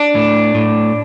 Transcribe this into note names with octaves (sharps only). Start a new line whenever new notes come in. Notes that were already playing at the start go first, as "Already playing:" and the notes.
Already playing: D4
A2
A2